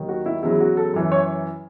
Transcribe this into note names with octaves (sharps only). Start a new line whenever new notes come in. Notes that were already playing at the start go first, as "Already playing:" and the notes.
Already playing: D#2 D#3 F#3
F#4
E4
E2 C#3 F#3 E4
F#4
A4
F#2 E3
C#5